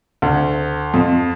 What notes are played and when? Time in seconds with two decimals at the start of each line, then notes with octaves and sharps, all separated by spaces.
0.22 D2
0.94 F2